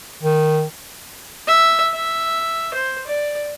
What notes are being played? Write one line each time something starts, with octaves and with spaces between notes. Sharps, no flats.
D#3
E5
E5
C5
D5